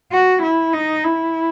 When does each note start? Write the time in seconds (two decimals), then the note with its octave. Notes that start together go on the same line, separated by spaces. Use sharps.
0.12 F#4
0.42 E4
0.73 D#4
1.04 E4